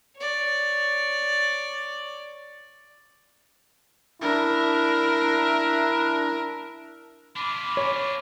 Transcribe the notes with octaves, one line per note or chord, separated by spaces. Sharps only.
C#5 D5
D4 E4 A#4 E5
D4 F4 B5 D6
C#5